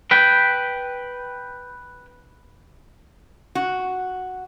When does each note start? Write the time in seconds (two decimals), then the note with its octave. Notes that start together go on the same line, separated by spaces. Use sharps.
0.11 B4 G5
3.55 F#4